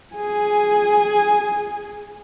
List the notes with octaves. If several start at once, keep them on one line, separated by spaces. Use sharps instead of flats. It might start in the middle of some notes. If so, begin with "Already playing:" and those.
G#4 G#5